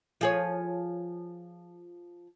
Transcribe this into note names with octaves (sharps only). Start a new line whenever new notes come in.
F3 G#4 C#5